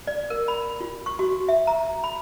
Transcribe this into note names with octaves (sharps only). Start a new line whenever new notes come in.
D5
A#4
B5
F4
C#6
F#4
E5
A#5
B5